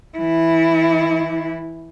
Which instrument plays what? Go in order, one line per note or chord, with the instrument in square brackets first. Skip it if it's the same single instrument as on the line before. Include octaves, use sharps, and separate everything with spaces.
[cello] E3 E4